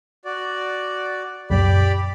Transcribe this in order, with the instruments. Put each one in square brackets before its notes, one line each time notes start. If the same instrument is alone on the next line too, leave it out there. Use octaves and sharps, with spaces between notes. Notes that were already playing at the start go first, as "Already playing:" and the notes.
[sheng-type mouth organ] F#4 D5
[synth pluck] C#2 F#2 A#2 [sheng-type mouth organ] G4 D5 B5